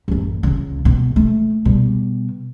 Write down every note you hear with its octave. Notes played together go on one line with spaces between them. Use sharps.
A1 F#2
C#2 C#3
B2
A3
B2 G3